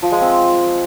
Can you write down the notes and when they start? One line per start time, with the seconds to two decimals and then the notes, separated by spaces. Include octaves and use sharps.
0.02 F3
0.12 G#3
0.21 C4